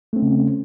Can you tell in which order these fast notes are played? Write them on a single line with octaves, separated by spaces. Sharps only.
A3 C4 C#4 C#3